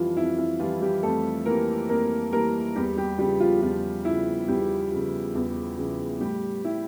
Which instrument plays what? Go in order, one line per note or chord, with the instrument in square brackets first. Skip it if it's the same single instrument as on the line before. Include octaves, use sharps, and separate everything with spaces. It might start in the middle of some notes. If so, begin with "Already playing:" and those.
Already playing: [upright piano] F2 E3 F3 G3 F4
F2 E4
E4
E3 F3 G3 F4
G3 G4
F2 A3 A4
E3 G3 A#3 A#4
F2 A#3 A#4
E3 G3 A#3 A#4
E2 G3 G4
G3 G4
C#3 F3 G3 G4
F3 F4
E2 F3 F4
C#3 F3 E4
E2 G3 G4
C#3 F3
E2
C#3 F3
A2 G3 G4
G3 E4